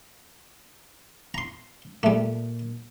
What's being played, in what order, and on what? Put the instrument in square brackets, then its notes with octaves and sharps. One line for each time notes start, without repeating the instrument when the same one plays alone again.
[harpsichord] A#5 C6
[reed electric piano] A#2 A#3 [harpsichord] G3 A3